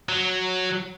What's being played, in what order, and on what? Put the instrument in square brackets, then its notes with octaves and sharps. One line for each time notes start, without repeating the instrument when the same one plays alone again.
[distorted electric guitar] F#3